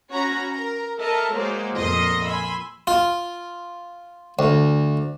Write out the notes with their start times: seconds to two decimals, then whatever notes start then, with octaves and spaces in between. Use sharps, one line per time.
0.12 C#4 F#4 C#5 A#5 B5
0.50 A#4 A#5
0.98 A4 A#4 D#5 E5 A5 A#5
1.34 F#3 G#3 A#3 C5 D5
1.74 F2 A#2 D#5 C6 D#6
2.25 G#5 B5 C6 E6
2.87 F4
4.39 D2